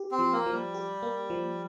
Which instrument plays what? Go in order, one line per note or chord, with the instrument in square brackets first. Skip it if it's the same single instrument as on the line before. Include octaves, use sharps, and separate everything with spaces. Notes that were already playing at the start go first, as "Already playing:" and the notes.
Already playing: [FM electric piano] G4
[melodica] C4
[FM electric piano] F3
[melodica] A#3
[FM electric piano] F3
[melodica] G3
[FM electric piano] G4
A#3
F3